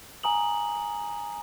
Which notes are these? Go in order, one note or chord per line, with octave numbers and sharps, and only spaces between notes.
G#5 A#5 D#6 F#7